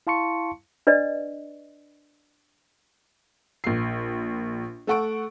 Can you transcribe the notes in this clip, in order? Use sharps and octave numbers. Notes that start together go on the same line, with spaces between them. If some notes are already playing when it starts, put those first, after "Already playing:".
E4 F5 A5 C6 C#6 C#7
D4 B4 D5 D#5
A#1 C7
A3 A4 F#5 C#6 D7